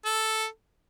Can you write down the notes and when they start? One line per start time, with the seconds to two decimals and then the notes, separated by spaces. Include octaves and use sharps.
0.05 A4